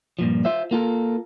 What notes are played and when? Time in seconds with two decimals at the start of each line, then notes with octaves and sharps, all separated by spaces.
0.19 G2 A#2 F3
0.45 F4 C5 E5
0.71 A#3 F4 A4 A#4